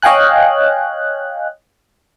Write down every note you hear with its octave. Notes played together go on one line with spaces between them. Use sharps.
C#5 D#5 F5 G5 G#5 F#6